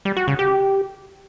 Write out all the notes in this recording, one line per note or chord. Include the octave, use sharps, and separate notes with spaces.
G3
F#4
C#3
G4